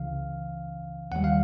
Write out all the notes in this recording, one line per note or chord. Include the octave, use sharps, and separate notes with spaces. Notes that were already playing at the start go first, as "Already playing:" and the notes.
Already playing: C#2 C#3 E3 F5
D#2 D#3 G3 F#5
F5